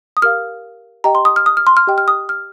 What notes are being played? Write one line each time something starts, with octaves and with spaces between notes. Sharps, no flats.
D#6
G4 A#4 F5 F6
G4 D#5 G5 A#5
C6
D#6
F6
D#6
F6
C6
F6
G4 D#5 G5
F6
D#6
F6